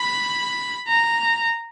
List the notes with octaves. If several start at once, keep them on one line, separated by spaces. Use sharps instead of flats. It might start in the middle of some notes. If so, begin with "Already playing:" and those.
Already playing: B5
A#5